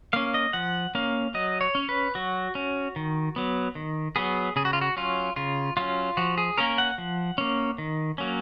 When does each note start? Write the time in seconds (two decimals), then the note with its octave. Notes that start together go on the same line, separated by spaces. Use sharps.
0.13 A#3 C#4 F5
0.34 D#5
0.53 F3 F#5
0.95 A#3 C#4 F5
1.34 F#3 D#5
1.61 C#5
1.75 C#4
1.89 B4
2.15 F#3 F#4
2.55 C#4
2.96 D#3
3.36 F#3 B3
3.75 D#3
4.16 F#3 B3 G#4
4.56 C#3 G#4
4.65 F#4
4.73 F4
4.81 F#4
4.97 F#3 C#4 F4
5.36 C#3 F4
5.77 F#3 C#4 F4
6.17 F3 F#4
6.38 G#4
6.58 A#3 C#4 A#4
6.78 F#5
6.98 F3
7.38 A#3 C#4
7.78 D#3
8.18 F#3 A#3 C#4